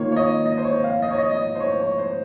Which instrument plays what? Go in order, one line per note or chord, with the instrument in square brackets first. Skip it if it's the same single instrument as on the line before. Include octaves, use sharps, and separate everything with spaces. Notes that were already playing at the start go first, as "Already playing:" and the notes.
Already playing: [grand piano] D#3 A#3 F4 [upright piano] C#5
[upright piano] C#5
D#5
D#5
C5
C#5
F5
D#5
C#5
D#5
D#5
C5
C#5
C#5
C5